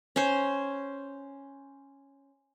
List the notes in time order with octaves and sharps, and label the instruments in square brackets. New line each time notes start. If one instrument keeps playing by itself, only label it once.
[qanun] C#4 C5